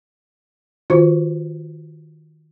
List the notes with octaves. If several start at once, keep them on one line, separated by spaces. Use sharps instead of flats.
D#3 F4 F#4 C5